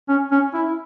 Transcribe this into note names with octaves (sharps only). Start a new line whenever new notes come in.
C#4
C#4
E4